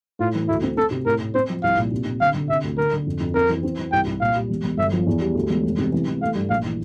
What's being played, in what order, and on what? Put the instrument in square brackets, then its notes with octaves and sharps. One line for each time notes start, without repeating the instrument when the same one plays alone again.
[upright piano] A2 [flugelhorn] F4
[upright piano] E3
[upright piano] D2 [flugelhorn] E4
[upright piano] C4
[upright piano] C4 [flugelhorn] A4
[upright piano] C3
[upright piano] A2 [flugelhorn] A#4
[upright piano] A2
[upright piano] C4 [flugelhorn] C5
[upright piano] F3
[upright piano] C2 [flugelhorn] F5
[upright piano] A#2
C3
C3
[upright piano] D3 [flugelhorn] F5
[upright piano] D3
[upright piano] C3 [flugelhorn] E5
[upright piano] D2
[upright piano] D3 [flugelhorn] A#4
[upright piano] D3
F2
F2
[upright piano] C4 [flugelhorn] A#4
[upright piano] E3
C4
E3
[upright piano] C2 [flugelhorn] G5
[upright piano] C2
[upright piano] A#2 [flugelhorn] F5
[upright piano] G3
E1
E1
[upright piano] G1 [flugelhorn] E5
[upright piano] F3
E2
G3
D2
E1
F1
C3
E3
E3
[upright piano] A3 [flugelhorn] F5
[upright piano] G2
[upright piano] A#1 [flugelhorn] F5
[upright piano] E3